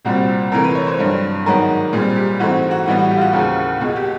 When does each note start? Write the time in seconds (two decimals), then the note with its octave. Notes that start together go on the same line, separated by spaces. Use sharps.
0.05 C2 A#2 G3 C4 F#4
0.52 C2 C3 E3 A3 A#4
0.64 B4
0.75 C#5
0.87 C5
0.99 G2 D3 F#3
1.46 G#2 D#3 F#3 B3 A#4
1.93 A#2 G3 C4 G#4
2.16 G4
2.40 G#2 E3 A3 C4 F#4
2.71 F#4
2.86 A2 E3 G3 B3 F#4
2.99 F#4
3.10 G4
3.17 F4
3.21 F#4
3.33 D#2 C#3 F3
3.81 C#2 B2 G#3 F#4
3.96 G4